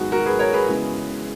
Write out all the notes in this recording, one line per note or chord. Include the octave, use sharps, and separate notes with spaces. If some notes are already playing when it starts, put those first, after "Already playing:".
Already playing: G#2 D#3 F#3 B3 F#4 G#4
F#4 A#4
G#4 B4
A#4 C#5
G#4 B4
C#3 E3 G#3 B3